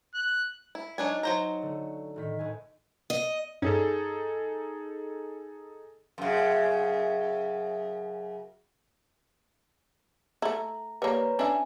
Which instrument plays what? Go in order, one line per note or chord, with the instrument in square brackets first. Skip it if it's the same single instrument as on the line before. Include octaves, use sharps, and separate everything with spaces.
[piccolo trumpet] F#6
[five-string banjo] E4
[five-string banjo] F#3 D4 G#5 [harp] D#4
[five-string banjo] F#3 C5 A#5
[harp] D3 A3
A2 D#3 B6
D2 A2 G#5
[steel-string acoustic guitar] D#5
[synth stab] G2 C#4 [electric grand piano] D#4 G#4 A4
[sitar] F#2 C#3
[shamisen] A3 E4 [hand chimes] A#5
[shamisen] G3 A#3 [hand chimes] B4 C#5 A#5
[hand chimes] C#4 G#5 [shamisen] D4 E4